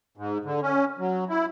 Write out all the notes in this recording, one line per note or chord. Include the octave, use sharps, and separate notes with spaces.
G#2
D3
C#4
F#3
E4